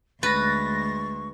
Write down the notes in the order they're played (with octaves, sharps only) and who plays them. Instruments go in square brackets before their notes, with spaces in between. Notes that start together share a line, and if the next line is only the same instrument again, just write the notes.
[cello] D2 G#3 [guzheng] B4 [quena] C#6 [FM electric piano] A6 A#6